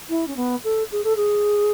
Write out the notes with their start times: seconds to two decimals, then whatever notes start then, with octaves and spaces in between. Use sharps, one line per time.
0.09 E4
0.27 C#4
0.36 B3
0.64 A4
0.92 G#4
1.04 A4
1.16 G#4